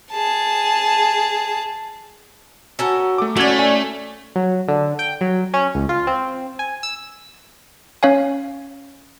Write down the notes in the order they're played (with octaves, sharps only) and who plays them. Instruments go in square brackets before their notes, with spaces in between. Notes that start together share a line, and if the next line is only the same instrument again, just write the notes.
[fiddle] G#4 A5
[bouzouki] C#4 A4 A#4 [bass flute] F#4
[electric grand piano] A3 D6
[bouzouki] A2 D5 [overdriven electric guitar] A3 [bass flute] C#4 [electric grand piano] F#4 G#6
[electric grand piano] G#5
[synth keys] F#3
D3
G5
F#3
C#4
C#2
F4
C4
G#5
E6
[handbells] C#4 C#5 F5 G#5